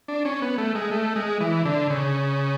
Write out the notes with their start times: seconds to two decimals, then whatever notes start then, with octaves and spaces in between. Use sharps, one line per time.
0.08 D4
0.25 C#4
0.42 B3
0.58 A3
0.75 G#3
0.91 A3
1.16 G#3
1.40 E3
1.65 D3
1.90 C#3